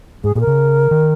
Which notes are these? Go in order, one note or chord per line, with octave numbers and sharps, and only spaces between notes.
G#2 G#4
A#2 G#4
A#4
C#3
D#3